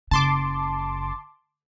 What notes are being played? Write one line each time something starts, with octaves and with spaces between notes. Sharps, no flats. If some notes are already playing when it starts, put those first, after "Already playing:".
F#1 C#3 A5 C6 D6